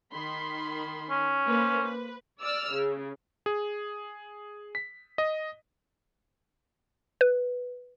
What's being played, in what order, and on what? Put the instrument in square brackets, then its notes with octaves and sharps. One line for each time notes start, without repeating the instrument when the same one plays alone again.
[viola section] D#3 B5 C6
[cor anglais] C#4
[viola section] A#3 B4 C5
B4
[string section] D5 E6 F6
C#3
[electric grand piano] G#4
B6
D#5
[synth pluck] B4